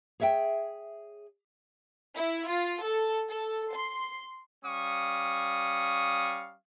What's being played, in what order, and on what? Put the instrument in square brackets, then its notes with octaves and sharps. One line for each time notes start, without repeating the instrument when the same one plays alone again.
[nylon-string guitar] G#4 C#5 E5 F5 G5
[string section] E4
F4
A4
A4
C6
[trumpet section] G3 C#4 F5 C#6 D#6